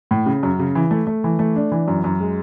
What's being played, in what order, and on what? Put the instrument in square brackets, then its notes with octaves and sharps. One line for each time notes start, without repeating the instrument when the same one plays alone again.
[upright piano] A2
C#3
F#2
C#3
E3
A3
A3
E3
A3
D4
E3
F#2
F#2
G#3